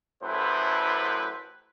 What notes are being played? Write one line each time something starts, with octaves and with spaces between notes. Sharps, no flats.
A1 F#2 A2 E4 B4 C5